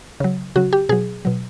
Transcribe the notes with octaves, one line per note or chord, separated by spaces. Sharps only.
C#3 F#3
C#3 F#3 F#4
G4
B2 F#3 G#4
B2 F#3